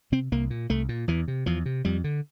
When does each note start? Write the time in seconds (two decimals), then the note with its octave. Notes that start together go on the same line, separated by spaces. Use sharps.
0.12 C3 C4
0.32 C2 A#3
0.50 A#2
0.70 C2 A3
0.89 A#2
1.08 E2 E3
1.28 C3
1.46 E2 F3
1.66 C3
1.85 F2 G3
2.04 D3